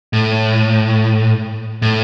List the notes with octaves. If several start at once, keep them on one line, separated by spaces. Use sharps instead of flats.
A2
A2